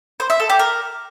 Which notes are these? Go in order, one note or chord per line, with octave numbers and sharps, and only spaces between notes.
C5
E5
A4
G4
A#4